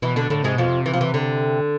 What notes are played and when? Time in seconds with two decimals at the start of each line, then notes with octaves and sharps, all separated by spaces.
0.02 B2 E3 E4
0.16 D3 D4
0.30 A2 D3 A3
0.43 G#2 C3 G#3
0.55 F2 B2 F3
0.68 C3
0.86 E3
0.94 F3
1.01 E3
1.14 D3